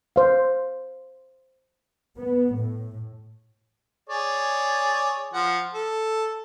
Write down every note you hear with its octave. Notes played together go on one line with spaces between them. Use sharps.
C5 F5
B3
A2
G#4 C#5 D5
F3 F#5
A4